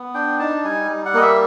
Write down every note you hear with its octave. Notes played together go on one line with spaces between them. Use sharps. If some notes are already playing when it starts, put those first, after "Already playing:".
Already playing: B3
D4 G5
D#4 A5
G3 G#5
G3
F#5
A#3 D#5
E5